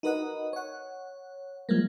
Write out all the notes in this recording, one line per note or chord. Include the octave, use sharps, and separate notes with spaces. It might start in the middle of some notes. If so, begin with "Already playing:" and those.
D#4 F#4 A#4 B4 D#5 F#5
C#5 F#5
F3 G3 G#3 A#3